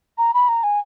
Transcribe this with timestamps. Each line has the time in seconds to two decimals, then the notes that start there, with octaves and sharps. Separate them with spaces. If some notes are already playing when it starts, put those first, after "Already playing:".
0.18 A#5
0.34 B5
0.48 A#5
0.63 G#5